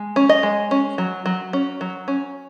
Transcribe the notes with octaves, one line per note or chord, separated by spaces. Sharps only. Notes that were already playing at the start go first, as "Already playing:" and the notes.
Already playing: G#3
C#4
D#5
G#3
C#4
F#3
F#3
C#4
F#3
C#4